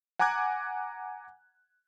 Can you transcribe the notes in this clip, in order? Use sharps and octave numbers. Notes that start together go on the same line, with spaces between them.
F#5 G#5 A#5 D6 F#6 G#6